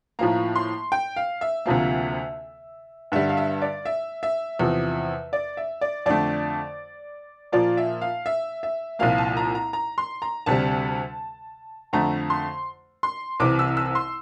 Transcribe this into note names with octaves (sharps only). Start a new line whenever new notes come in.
A2 F3 A#3 A#5
C6
G5
F5
E5
D2 C3 F3 A#3
G2 D3 G3 E5
F5
E5
D5
E5
E5
E2 C3 F3
D5
E5
D5
F2 D3 A3 D5
A#2 F3 A#3 D5
E5
F5
E5
E5
C2 A#2 F3 A#3 F5
A5
A#5
A#5
A#5
C6
A#5
D2 C3 G3 A5
F2 D3 A3 A#5
C6
C6
C2 C3 E3 D6
E6
E6
C6